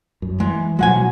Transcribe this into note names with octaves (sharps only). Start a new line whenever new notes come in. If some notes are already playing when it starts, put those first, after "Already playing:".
F#2
E3 G#3
B2 F3 F#3 G#3 F#5 G#5